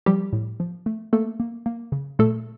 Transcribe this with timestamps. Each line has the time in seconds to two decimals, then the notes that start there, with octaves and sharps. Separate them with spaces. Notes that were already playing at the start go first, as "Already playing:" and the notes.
0.06 F3 G3 G4
0.33 A2
0.60 F3
0.86 A3
1.13 A3 A#3 A4
1.40 A#3
1.66 A#3
1.92 C#3
2.19 A#2 A3 A4